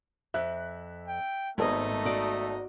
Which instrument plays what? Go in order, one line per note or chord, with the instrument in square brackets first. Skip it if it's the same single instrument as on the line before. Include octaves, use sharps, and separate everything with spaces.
[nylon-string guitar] F2 [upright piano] E5 F#6
[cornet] G5
[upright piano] G#1 B3 A4 [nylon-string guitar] G#2 [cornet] A3 [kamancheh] D#4 D#5
[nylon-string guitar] F#4 D5